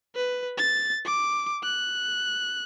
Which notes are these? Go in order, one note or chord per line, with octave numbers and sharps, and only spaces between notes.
B4
A6
D6
F#6